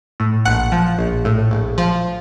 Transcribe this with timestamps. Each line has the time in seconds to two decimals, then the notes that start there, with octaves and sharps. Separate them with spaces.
0.20 A2
0.45 A#1 F#5
0.72 F3
0.99 A#1
1.25 A2
1.51 A#1
1.78 F3